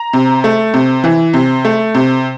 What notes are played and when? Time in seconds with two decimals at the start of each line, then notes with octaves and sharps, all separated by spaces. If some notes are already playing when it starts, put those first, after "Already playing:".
Already playing: A#5
0.13 C3
0.44 A3
0.74 C3
1.04 E3
1.34 C3
1.65 A3
1.95 C3